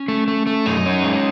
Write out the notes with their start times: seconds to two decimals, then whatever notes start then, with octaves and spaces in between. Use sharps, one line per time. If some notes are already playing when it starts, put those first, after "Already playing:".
Already playing: C#4
0.08 A3
0.28 A3
0.47 A3
0.66 F#2 D#4
0.86 C#4
1.04 G#3